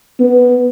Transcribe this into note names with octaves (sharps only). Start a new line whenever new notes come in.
B3